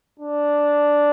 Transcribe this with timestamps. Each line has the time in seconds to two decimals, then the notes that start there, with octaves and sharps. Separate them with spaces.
0.20 D4